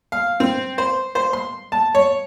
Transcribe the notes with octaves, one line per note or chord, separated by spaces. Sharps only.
F5
C4
C5
C5
C6
A5
C#5